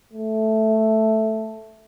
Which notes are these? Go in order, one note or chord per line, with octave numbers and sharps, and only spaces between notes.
A3